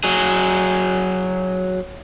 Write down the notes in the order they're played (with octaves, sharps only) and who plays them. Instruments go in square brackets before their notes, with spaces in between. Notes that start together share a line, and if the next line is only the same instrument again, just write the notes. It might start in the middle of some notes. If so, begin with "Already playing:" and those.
[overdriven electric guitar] F#3 G#4